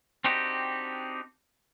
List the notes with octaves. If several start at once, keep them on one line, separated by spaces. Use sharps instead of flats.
C4 D4 D#4 F#4 G4